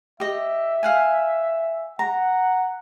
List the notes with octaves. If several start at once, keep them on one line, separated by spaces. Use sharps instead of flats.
G4 D#5 E5
F5 F#5 G#5
F#5 A#5